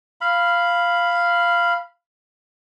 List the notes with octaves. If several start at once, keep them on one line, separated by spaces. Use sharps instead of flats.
F5 B5